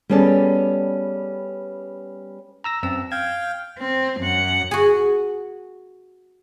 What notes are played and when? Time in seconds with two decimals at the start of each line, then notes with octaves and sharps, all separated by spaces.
0.10 G3 B3 C#4 G#4 A4 D5
2.64 A#5 E6 A#6
2.83 F#2 C4 E6
3.12 F5 G5 G#6
3.79 C4
4.21 F#2 F#5
4.71 F#4 G#4